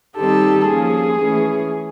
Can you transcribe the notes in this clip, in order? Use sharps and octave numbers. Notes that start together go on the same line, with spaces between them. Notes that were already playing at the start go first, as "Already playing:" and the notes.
D#3 G3 C4 D#4 G4 A4
F3 A#3 C#4 G#4
E3 A3 C#4